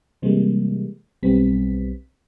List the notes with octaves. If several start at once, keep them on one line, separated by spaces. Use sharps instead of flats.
C3 E3 G3 G#3 A#3
B1 G3 B3 C4 B6